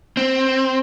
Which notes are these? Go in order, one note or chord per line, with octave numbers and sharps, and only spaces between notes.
C4